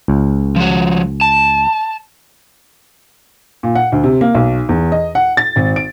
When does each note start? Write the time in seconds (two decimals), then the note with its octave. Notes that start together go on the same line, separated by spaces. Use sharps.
0.08 C#2
0.56 F3 F#4
1.21 A5
3.63 A#2
3.75 F#5
3.92 D2
4.04 C3
4.21 A#3
4.35 B1
4.69 E2
4.92 D#5
5.15 F#5
5.37 A6
5.56 G#1
5.76 D7